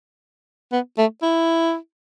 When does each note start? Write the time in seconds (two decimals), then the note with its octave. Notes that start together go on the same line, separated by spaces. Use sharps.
0.72 B3
0.98 A3
1.22 E4